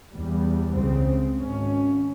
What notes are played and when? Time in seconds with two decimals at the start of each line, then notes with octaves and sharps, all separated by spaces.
0.10 E2 G3
0.77 C#2 C#3 C4
1.40 G#1 C#4